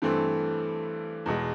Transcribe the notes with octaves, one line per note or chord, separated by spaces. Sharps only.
G2 E3 A3 C4
E2 B2 G#3